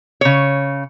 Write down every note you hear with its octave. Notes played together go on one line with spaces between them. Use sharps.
C#3 C#5